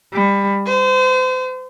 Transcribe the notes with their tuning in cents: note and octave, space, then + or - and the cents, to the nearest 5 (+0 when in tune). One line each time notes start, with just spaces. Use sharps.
G3 +25
C5 -35